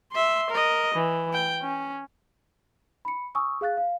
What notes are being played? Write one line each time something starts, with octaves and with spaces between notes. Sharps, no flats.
E5 C6
A#4 D#5
E3
G5
C#4
B5 C#7
G#5 C#6 D#6 E6
G#4 F5 F#6 A6
F5